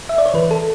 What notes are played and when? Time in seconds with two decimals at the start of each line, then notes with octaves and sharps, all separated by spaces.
0.09 E5
0.18 D5
0.26 C#5
0.34 E3 B4
0.51 A4